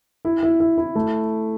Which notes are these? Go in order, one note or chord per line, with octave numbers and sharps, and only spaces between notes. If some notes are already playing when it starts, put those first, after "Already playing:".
E4
E4
E4
E4
A3